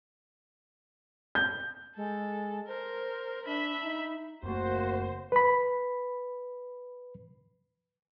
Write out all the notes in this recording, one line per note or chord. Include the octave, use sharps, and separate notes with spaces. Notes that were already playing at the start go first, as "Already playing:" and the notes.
G6
G#3 A4
A#4 C5
D4 E5 B5
D#4
F#1 A3 A#3 F#4 C5
B4 B5